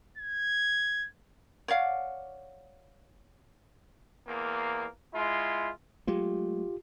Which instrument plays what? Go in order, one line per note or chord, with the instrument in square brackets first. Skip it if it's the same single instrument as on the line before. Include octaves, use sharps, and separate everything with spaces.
[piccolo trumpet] G#6
[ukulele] C#5 D5 F5 F#5
[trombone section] E2 A#3
G#3 E4 F4
[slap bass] F#3 G#3 A3 [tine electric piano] F4 G4